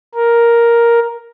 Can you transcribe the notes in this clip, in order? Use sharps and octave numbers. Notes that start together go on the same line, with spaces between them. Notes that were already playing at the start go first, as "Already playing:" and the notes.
A#4